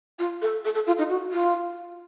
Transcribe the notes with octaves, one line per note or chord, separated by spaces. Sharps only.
F4
A4
A4
A4
F4
D#4
F#4
F4